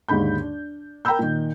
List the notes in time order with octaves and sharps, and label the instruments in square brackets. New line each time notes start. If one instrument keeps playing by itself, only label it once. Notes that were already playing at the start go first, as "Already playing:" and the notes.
[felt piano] D#2 G#2 D3 D#4 B5 G6
D4
A#4 G5 A#5 B5 E6 G6
A#2 D#3